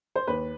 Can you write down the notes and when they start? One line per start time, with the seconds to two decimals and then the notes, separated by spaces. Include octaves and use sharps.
0.16 C5
0.28 D#2 B4